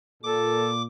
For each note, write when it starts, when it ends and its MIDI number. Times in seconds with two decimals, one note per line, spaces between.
0.23 0.85 46
0.23 0.71 69
0.23 0.82 86